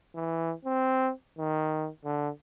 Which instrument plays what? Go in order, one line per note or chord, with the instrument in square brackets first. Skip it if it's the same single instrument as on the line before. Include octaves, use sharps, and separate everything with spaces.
[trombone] E3
C4
D#3
D3